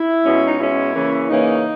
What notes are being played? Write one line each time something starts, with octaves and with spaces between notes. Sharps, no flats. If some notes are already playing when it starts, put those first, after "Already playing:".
Already playing: E4
B2 G#3 C#4
D#4
B2 G#3 C#4 E4
C#3 E3 A#3 C#4
C#3 E3 A#3 C#4 D#4